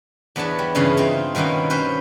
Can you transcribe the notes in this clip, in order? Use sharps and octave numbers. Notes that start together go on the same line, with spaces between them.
E2 B3 D4 C#5 A5
G3
E2 G2 C#3 E3 C#4 F5
C4 D#4 F4 A#5
B2 D#3 A#3 B3 C#4
C#4 F4 B4 C5